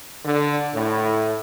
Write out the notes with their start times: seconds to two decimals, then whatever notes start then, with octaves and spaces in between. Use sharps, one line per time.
0.25 D3
0.73 A2